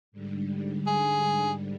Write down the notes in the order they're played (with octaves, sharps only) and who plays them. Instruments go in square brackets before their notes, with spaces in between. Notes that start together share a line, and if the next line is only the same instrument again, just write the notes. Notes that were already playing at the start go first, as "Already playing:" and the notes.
[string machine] G#2 D3 G3
[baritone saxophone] G#4